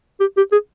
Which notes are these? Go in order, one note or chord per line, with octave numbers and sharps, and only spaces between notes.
G4
G4
G#4